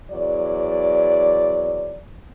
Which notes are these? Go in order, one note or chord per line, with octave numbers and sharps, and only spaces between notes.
E2 F#3 D5